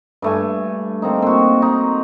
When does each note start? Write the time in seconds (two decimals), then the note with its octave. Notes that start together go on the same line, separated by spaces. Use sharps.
0.22 G2 A3 G#5
1.02 A#3 C4 D#4
1.22 C4 F#4
1.62 D#4